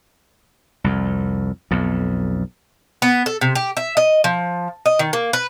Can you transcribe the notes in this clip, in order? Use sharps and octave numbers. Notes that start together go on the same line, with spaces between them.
C2 F2
B1 F2
B3
A4
C3
G4
E5
D#5
F3
D#5
D#3
A#3
B4